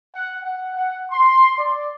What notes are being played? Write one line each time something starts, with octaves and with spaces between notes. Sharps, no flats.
F#5
F#5
F#5
C6
D5